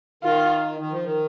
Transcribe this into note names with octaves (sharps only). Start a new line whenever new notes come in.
D#3 F4
D#3
F3
D#3